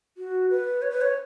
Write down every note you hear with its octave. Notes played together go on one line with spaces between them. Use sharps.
F#4
B4
C#5
B4
C#5